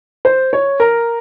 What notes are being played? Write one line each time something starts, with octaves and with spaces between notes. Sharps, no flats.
C5
C#5
A#4